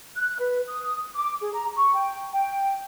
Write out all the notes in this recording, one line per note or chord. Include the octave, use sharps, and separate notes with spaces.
F#6
B4
D#6
D6
G#4
A#5
C#6
G5
G5